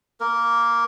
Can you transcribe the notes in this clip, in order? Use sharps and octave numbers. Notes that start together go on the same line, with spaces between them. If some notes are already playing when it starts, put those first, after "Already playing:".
A#3 A#4